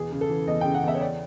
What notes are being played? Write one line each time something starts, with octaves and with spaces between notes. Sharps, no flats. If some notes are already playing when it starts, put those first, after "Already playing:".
Already playing: E2 B2 G#4
C#3
A4
E3
E2 D#5
C#3 G5
F#5
E2 E5
C#5
D5